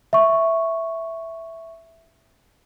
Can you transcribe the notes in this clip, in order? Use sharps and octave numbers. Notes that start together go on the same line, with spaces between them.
E5 C#6